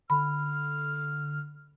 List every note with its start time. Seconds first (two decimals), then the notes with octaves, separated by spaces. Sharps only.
0.10 D3 B5 F6